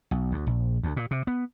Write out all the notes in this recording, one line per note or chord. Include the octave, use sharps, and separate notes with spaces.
B1
D2
A#1
D2
A#2
C3
B3